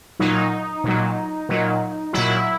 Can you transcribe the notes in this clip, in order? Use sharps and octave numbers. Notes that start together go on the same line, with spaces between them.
A#2 F#3 D#4
A#2 F#3
A#2 F#3
A#2 F#3 E4